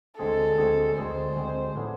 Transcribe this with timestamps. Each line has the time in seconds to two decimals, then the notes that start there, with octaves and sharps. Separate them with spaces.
0.19 D2 D3 G#3 C4 G#4 A4
0.58 D2 D3 G#3 C4 G#4
0.97 D2 D3 G#3 C4 G#4 C5
1.36 D2 D3 G#3 C4 G#4
1.75 A2 F3 B3 D4 G#4